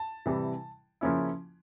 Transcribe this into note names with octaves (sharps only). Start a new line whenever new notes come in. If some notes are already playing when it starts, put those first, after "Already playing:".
Already playing: A5
C3 E3 G3
C#3 F3 A#3 C#4 E4